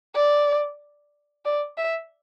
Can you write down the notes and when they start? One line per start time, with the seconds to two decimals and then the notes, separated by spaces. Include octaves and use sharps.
0.15 D5
1.45 D5
1.78 E5